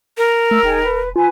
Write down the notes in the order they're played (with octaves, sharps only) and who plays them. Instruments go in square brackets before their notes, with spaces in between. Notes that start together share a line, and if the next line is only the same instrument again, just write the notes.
[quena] A#4
[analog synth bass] A3 [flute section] E6
[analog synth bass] E1 [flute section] D#4 G#4 G5
[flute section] B4
[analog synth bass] F4 [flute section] B4 G#5